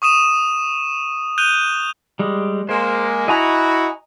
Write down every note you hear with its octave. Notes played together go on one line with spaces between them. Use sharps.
C#6 D#6 D#7 E7
F#6 G6 D#7 F7 G7
G3 G#3
G#3 A#3 C5
E4 F#4 D#5 G#5 A#5